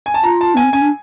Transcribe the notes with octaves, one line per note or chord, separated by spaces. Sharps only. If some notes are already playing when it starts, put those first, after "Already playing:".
G#5
A5
F4 A#5
A5
B3 G#5
C4
C#4 G#5
D4